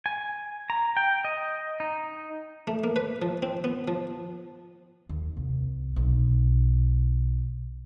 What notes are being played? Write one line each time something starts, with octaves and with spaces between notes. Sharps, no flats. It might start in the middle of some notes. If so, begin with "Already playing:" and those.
G#5
A#5
G5
D#5
D#4
A3
A#3
B4
F3
C4
B3
F3
D#2
C2
B1